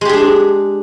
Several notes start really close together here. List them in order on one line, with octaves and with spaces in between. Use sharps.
G#3 G4 G#4 D4